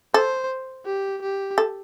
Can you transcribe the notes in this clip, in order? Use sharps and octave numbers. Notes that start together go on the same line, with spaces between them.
A4 C5
G4
G4
A4